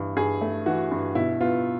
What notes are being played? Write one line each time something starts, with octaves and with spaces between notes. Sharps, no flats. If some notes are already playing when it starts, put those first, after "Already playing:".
Already playing: G2 E3
G2 G#4
A3
E3 F#4
G2
B2 E4
B3 F4